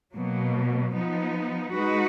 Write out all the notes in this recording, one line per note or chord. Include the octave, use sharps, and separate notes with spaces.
B2 F#3 A#3
F3 B3 D#4
G#3 D#4 F#4 B4